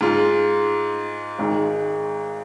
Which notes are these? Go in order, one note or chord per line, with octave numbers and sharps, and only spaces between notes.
G#2 G#3 F4
G#1 G#2 D#3 G#3